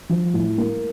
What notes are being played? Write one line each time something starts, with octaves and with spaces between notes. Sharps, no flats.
F3
A2
A#3